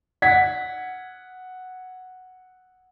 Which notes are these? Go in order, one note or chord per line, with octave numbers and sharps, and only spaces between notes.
F#5 G#6 B6